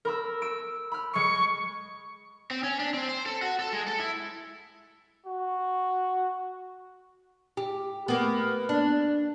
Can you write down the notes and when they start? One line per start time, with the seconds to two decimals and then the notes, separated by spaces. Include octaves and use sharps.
0.05 A#4 B5 E6
0.42 E6 D7
0.92 B5 F6
1.14 G#3 C#6 C#7
2.51 C4
2.63 C#4
2.80 D4
2.94 C4
3.09 C5
3.26 A4
3.42 F#4
3.60 A4
3.73 G#3
3.87 A4
4.00 E4
5.26 F#4
7.57 G4
8.08 A#3 B3
8.69 D4